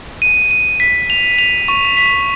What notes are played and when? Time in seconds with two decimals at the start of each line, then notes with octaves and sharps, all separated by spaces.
0.22 D#7
0.51 D#7
0.80 B6
1.10 F7
1.38 F7
1.68 C#6
1.97 B6